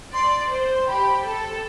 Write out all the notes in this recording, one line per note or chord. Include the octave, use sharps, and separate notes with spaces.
D5 C6
C5
C6
G4 B5
A4